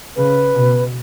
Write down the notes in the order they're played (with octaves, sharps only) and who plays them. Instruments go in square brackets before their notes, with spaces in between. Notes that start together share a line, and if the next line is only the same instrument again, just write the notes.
[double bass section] C#3 [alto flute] B4
[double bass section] B2